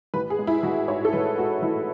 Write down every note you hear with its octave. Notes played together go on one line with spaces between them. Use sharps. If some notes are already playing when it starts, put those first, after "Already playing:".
A1 B4
G#4
G#3
E4
A1 F#4
G#2 C#5
A4
A1 B4
G#3 F#4
A1 E4